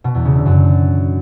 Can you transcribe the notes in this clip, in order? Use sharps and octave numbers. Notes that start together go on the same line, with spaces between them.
B2
E2
C#3
D3
F#2